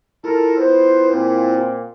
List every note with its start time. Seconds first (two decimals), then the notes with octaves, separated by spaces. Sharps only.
0.24 E4 F4 A4 A#4
0.58 B3 B4 C5
1.10 A#2 C4